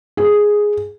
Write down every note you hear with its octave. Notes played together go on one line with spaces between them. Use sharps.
G#4